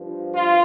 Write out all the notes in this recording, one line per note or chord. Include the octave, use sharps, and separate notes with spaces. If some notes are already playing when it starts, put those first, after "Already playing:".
Already playing: G2 F3
F4